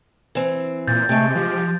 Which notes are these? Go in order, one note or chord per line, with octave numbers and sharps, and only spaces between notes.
E3 C4
A#2 G6 A6
C3 G#3 A3 G5
F3 G4